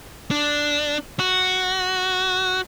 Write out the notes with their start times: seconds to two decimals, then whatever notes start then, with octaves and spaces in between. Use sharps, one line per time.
0.31 D4
1.19 F#4